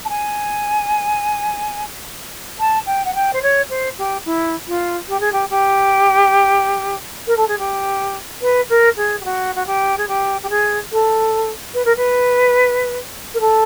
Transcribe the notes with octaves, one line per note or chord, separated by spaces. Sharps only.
A5
G#5
A5
G5
F#5
G5
C5
C#5
C5
G4
E4
F4
G4
G#4
G4
G4
A#4
A4
G#4
G4
B4
A#4
G#4
G4
F#4
F#4
G4
G#4
G4
G4
G#4
A4
B4
A#4
B4
A#4
A4